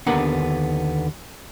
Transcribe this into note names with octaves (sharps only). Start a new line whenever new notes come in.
D#2 D3 B3 D4 A#4 F#5